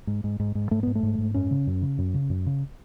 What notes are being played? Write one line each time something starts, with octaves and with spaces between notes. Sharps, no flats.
G#2
G#2
G#2
G#2
G#2 A3
G#2 B3
A3
G#2
G#2
F#2 C#4
C#3
F#2
C#3
F#2
C#3
F#2
C#3